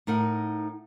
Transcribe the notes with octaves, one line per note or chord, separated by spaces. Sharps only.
A2 D#4 A#4 F#5